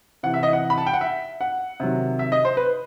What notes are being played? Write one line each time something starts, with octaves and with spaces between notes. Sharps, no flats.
C3 E3 F#5
E5
D#5
F#5
B5
A5
G5
F#5
E5
F#5
C3 D#3 F#3
E5
D#5
C5
B4